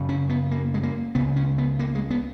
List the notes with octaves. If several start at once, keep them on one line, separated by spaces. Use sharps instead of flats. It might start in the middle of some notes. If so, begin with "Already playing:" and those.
Already playing: F#2 C#3
C#4
B3
A#3
G#3
A#3
C#2 C#3 B3
C#4
B3
A#3
G#3
B3